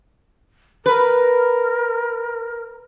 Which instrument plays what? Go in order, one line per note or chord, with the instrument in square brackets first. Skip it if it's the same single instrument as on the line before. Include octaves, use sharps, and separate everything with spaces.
[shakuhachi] A#4 [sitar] B4